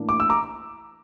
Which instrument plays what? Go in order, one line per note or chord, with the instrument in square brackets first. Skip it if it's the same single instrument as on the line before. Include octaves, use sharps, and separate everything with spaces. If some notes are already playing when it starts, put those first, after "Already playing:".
Already playing: [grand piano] A2 E3 A#3 D4
D6
E6
A#5 D6